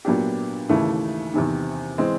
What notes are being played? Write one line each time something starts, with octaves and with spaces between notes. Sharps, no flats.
A#2 F#3 B3 D4 G4
D#2 C#3 E3 A3
E2 C3 D#3
E3 G#3 C4